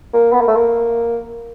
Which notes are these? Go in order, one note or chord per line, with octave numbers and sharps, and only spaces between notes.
A#3
B3
A#3
A3
A#3